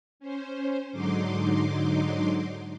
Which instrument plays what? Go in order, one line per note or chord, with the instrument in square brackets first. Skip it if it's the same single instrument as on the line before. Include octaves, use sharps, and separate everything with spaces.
[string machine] C#4 C5
G#2 D3 F#3 D#4 C6 D6